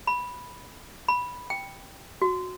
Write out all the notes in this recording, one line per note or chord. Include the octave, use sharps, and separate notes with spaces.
B5
B5
G5
F#4